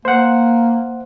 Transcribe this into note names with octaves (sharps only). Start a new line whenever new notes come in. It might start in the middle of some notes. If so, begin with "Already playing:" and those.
A#3 C5 F#5